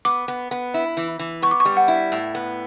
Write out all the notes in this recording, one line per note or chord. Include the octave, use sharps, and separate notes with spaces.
B3 D6
B3
B3
E4
E3
E3
B3 C#6
D6
C#6
G3
F#5
E4
A2
B3